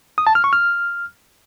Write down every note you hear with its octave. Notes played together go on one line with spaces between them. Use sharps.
D#6
A5
F6
C#6
F6